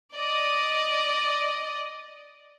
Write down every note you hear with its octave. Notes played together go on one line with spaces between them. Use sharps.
D5 D#5